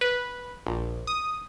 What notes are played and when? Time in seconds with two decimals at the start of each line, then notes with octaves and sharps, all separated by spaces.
0.01 B4
0.67 A#1
1.07 D#6